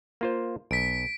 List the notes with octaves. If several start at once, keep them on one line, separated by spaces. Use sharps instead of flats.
A#3 F4 C5
B1 B6 D7